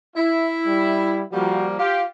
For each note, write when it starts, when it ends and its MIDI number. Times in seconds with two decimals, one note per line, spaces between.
0.16 1.22 64
0.16 0.48 76
0.67 1.24 55
1.33 1.78 53
1.33 1.78 55
1.33 1.78 58
1.33 1.66 66
1.79 2.03 65
1.79 2.03 67
1.79 2.07 77